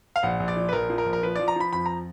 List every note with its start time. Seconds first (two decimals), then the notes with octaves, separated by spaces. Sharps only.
0.16 F5
0.23 A#1 F#5
0.40 A#1
0.48 D5
0.57 F3
0.69 B4
0.73 A#1 A#4
0.90 F3
0.98 A#4
1.06 A#1
1.13 A#4
1.23 F3 B4
1.36 F3 D5
1.48 A#5
1.56 F3 B5
1.73 F2 B5
1.86 A#5